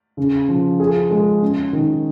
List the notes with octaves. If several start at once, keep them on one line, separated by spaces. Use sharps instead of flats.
C#3
F3
G#4
G#3
C#4
D#3